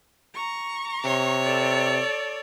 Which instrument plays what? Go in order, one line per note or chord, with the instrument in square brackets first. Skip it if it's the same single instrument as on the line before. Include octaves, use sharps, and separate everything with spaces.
[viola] A#5 C#6
[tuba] C3 [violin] C#5
[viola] A4 D5